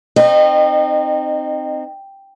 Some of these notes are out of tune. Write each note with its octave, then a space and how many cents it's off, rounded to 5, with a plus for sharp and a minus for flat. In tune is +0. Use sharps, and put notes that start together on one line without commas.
C4 +0 D#4 -20 D#5 -35